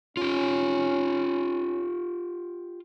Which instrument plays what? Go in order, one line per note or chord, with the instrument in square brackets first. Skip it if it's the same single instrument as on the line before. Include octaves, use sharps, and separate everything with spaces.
[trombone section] C#4 [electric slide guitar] F4 G4